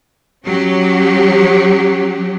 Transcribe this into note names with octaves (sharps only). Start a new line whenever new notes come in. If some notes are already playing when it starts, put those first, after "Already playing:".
F#3 C#4 G4